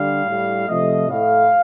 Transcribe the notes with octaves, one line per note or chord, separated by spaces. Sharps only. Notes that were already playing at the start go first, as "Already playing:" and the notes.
Already playing: D3 G3 F5
A2 G3
C3 F3 A3 D#5
A2 A3 F5